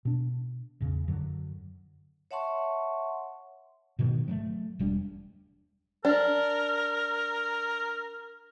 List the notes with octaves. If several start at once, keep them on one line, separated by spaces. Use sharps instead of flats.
B2 D4
A1 E2 C#3
F#2 D3 F#3
C#5 E5 F#5 A5 C6 C#6
G#2 B2 D#3 F#3
F#3 G#3 A3
E1 G3 C#4 D4
D4 A#4